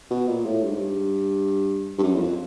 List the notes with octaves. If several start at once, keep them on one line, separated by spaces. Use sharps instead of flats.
B2
A#2
A2
G2
G#2
G2
G2
F#2
E2
F2